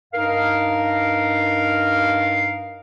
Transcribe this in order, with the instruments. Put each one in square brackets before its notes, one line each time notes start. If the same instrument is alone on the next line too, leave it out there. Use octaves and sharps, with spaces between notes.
[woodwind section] G2 D#4 A#4 F5